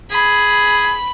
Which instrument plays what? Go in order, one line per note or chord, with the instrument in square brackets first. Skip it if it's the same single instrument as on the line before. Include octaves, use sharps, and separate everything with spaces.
[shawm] G#4 [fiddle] B5